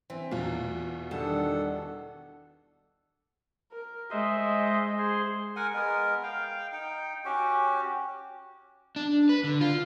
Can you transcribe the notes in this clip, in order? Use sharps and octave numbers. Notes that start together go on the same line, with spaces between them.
E3 C4
E2 B2 F4
D#3 G3 D4 A4 F#5 A5
A#4
G#3 C5 D#5 E5
G#4 C5 C6
A#4 F#5 G#5
G#3 B3 A#4
F5 G5
D#4 G5
C#4 F#4 G4
D4
B4
D3
F4